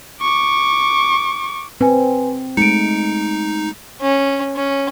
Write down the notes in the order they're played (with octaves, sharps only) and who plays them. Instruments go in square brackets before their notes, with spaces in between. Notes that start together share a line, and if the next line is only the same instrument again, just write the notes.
[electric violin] C#6 D6
[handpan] C4 [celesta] B4 G#5
[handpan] G#3 A3 [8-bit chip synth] D#4 [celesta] C#7 D7
[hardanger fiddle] C#4
C#4